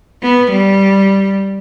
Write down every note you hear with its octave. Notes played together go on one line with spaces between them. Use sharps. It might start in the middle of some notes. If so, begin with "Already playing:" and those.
B3
G3